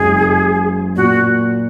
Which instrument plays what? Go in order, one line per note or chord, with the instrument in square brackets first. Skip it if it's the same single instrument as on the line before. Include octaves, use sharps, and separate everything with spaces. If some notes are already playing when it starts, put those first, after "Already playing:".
Already playing: [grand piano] F#1 F#2 C#3 G#3 [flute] G#4
[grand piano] A#2 [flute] F#4